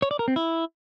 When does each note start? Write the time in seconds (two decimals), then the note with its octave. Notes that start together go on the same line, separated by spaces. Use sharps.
0.02 C#5
0.11 D5
0.19 A#4
0.28 C4
0.36 E4